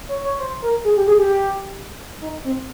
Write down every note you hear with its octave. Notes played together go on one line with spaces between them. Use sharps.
C#5
C#5
C5
A#4
G#4
G4
G#4
G4
D#4
C4